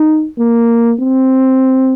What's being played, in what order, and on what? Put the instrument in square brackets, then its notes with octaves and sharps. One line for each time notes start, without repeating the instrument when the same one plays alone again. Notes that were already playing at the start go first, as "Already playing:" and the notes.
Already playing: [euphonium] D#4
A#3
C4